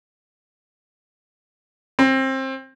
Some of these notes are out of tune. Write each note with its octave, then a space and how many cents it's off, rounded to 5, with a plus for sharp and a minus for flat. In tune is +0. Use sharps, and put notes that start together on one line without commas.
C4 +25